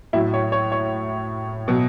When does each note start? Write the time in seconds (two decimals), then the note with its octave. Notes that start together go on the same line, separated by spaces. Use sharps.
0.13 A2 F#3 E4
0.34 C#5
0.52 C#5
0.72 C#5
1.68 B2 F#3